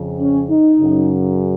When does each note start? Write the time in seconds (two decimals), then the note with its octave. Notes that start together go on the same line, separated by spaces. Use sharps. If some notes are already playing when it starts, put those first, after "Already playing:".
Already playing: F2 C#3
0.20 C#4
0.50 D#4
0.79 F#2 C#3